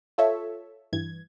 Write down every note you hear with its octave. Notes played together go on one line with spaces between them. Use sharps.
F4 A4 C#5 E5
G2 E3 G#6